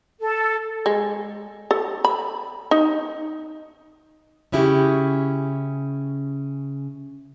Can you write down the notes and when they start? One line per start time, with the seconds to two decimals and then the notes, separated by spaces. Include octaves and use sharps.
0.21 A4
0.86 G#3
1.71 A4
2.05 B5
2.71 D#4
4.52 C#3 C#4 E4 F#4 G4